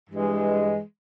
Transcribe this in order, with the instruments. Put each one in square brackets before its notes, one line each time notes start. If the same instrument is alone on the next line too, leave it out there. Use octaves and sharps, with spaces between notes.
[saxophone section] G2 E3 G#3